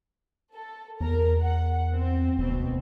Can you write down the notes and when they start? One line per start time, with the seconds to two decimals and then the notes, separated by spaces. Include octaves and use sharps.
0.54 A4
1.01 E2 A#4 A#5
1.42 F#5
1.92 C4
2.38 D#1 D2 B2 C4